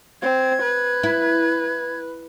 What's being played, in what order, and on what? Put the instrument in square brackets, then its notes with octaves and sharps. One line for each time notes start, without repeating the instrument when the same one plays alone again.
[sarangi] C4 [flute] G#6
[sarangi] B4
[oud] E4